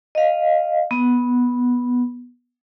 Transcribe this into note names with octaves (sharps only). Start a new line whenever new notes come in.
D#5 F5
B3